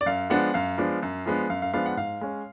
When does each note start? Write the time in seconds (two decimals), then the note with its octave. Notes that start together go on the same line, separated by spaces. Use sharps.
0.01 D5
0.06 F#2 F5
0.30 F3 G#3 B3 D4 F#5
0.54 F#2 F5
0.78 F3 G#3 B3 D4
1.03 F#2
1.26 F3 G#3 B3 D4
1.50 F#2 F5
1.62 F5
1.73 F3 G#3 B3 D4 F5
1.86 F#5
1.97 G#2 F5
2.21 G#3 C#4